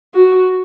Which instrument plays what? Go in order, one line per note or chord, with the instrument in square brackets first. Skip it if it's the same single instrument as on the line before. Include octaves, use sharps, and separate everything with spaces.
[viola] F#4